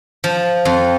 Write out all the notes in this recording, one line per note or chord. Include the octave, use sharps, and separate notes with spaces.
F3
F2